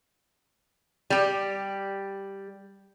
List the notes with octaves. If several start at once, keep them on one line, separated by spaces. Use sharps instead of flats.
G3 G4